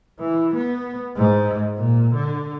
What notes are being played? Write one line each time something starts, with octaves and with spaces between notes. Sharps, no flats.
E3
B3
G#2
A#2
D3